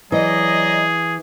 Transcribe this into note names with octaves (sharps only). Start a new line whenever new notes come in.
E3 F#3 G#4 D5 D#5